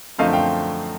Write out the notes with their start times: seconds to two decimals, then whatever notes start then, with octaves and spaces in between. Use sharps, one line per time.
0.18 F#2 D3 F3 A3 C4 D#5 F5
0.33 F5 G5